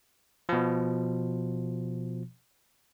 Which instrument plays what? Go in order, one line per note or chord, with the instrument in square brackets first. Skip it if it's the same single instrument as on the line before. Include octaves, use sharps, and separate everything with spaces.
[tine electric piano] B2 F3